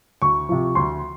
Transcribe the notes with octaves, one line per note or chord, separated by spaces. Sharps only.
D2 C#6
C3 F3
D2 C6